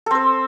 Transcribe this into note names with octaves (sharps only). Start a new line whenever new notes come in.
C4 A4 C5